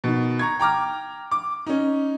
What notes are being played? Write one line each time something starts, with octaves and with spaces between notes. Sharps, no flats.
B2 D#3
A#5 C#6 G#6
G5 A#5 D6 F6
D6
C#4 D#4